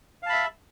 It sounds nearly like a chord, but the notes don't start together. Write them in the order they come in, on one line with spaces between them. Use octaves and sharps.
F5 A5 B5 E5